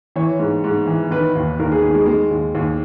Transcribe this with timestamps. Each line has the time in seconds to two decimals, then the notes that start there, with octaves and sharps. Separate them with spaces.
0.16 E3 C#5
0.39 G#2
0.64 G#2
0.87 E3
1.11 D#3 B4
1.35 D#2
1.60 D#2 A#4
1.72 G#4
1.83 D#3
1.95 G#3
2.06 D#3 G#3
2.31 D#2
2.55 D#2